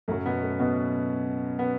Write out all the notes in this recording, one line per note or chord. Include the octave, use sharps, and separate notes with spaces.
F#2 C#3 F#3 A3
B2 B3
A3
B2 B3
B3